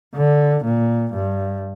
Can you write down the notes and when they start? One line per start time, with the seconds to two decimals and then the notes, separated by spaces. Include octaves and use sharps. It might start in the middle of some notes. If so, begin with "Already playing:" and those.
0.15 D3
0.64 A#2
1.13 G2